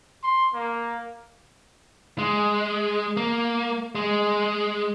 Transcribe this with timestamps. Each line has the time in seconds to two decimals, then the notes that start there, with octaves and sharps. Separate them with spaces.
0.23 C6
0.54 A#3
2.18 G#3
3.17 A#3
3.95 G#3